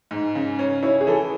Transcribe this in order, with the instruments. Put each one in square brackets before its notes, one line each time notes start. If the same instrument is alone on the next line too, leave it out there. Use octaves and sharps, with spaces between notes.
[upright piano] G#2
C#3
C#4
[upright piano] E4 [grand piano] C#5
[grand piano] G#4
[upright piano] E3 [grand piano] A4